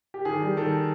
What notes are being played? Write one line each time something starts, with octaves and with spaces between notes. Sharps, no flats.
G4
D#3 G#4
G3
D#3 A4